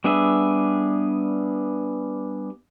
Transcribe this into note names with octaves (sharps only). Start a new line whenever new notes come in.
G3 B3 D4 G#4 E5